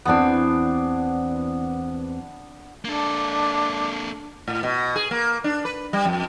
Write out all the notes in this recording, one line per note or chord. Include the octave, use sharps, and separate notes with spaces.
E2 E3 B3 C4 D4
A#3 D4 A4
A2
B2
G#4
A#3
D4
B4
G3
F2